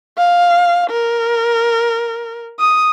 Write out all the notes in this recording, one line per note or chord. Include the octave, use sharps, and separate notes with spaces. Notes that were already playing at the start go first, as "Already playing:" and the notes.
F5
A#4
D#6